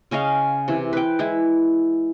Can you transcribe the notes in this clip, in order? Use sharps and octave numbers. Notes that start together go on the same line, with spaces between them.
C#3 C#4 D#5 F5
C3 E3
B4 G5
G#3 E4